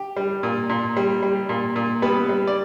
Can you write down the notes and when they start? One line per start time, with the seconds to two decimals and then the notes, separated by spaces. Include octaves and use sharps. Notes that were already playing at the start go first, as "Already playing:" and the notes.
Already playing: G4
0.17 G3
0.43 A#2
0.69 A#2
0.97 G3
1.23 G3
1.49 A#2
1.76 A#2
2.02 G3 B3 B4
2.29 G3
2.47 D5